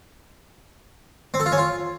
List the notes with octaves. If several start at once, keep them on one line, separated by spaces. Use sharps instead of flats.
C4
A4
F4
C#4
F4